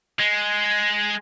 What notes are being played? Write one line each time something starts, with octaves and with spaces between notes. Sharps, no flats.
G#3